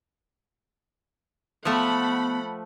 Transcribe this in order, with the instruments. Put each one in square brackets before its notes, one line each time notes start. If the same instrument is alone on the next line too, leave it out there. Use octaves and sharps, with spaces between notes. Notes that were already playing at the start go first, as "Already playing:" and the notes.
[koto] F3 A3 [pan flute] B3 [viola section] F#5 B5